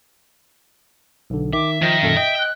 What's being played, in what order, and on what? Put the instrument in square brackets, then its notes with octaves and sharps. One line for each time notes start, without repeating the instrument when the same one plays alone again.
[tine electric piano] B1 D3
[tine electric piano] D#3 [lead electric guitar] E5 [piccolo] D6
[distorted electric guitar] D#3 [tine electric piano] F3 [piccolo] A#6
[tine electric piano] F#2 A#2 A4
[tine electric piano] D#5 [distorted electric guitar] G5
[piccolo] F#6